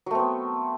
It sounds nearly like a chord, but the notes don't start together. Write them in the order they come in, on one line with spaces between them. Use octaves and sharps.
F#3 A3 C4 B3